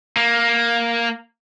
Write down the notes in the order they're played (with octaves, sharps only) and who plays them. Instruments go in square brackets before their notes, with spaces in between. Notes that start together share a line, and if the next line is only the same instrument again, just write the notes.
[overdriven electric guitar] A#3